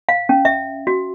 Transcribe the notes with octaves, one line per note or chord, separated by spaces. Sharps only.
F5
C#4
E5
F#4